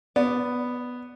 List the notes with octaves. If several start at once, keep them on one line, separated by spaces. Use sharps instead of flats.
B3 D5